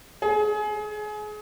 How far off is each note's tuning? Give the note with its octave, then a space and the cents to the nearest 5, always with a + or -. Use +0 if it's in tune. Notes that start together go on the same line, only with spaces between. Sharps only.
G#4 +25